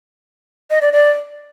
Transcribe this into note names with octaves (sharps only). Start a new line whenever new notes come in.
D#5
D5
D5